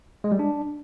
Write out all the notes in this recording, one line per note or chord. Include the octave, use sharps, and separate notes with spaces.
G#3
G3
D4